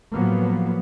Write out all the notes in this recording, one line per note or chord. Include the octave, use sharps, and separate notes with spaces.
A2 F3 F#3 A#3 B3